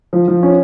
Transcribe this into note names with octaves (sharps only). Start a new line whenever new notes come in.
F3
F3
C#4